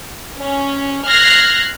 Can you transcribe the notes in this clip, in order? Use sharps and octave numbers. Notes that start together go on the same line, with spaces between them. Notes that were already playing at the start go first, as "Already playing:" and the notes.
C#4
F6 F#6 G#6 A#6 C7